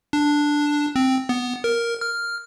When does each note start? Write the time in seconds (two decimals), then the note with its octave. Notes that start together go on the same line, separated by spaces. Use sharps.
0.13 D4
0.96 C4
1.29 B3
1.64 A#4
2.01 F6